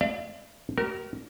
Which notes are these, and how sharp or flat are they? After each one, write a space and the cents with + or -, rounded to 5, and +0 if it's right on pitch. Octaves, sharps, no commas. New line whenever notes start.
D5 +35 F5 -45
G4 -45 A#4 +0